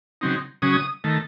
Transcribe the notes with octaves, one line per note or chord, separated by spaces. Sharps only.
C#3 F#3 C4 D#4
C#3 F#3 C#4 D#6
D#3 A3